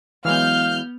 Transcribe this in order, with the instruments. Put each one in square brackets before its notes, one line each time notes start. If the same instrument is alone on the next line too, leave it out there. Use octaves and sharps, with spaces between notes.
[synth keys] E3 F#3 G#3 [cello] B3 [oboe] F5 [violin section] F6 G6